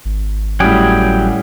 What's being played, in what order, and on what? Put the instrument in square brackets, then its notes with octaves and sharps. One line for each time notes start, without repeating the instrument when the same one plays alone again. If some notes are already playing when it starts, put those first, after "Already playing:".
[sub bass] G#1
[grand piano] A2 G3 C#4 [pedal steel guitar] F#3 G4 G#4